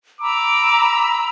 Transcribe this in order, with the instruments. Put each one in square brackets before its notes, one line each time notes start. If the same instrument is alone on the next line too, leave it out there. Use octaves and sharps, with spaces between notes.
[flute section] A#5 B5 E6 [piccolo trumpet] D6